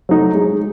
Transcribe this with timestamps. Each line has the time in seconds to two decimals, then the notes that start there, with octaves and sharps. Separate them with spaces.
0.09 F#3 A3 D#4
0.35 G#3